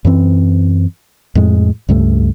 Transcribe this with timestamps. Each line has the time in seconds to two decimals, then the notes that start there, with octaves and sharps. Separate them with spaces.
0.05 F#2 E3 C4
1.35 F2 A2 G#3
1.89 C#2 G2 A3